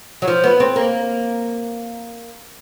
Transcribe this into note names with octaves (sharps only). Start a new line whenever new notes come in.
F#3
F3
B3
C4
A#3